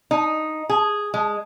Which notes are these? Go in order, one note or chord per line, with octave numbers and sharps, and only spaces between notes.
D#4
G#4
G#3